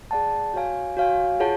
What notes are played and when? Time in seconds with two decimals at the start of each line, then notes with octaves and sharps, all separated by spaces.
0.11 G#4 D5 F#5 A5
0.53 F#4 C#5 F5 G#5
0.97 F#4 C#5 F5 G#5
1.40 F4 G#4 C#5 F#5 A5